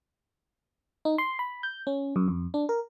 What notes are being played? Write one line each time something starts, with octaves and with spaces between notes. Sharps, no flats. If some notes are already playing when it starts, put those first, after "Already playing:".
D#4
C6
B5
G6
C#4
F#2
F2
D4
A#4